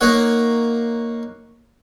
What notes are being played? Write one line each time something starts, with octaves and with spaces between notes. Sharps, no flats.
A#3 D#4 C#5 F#5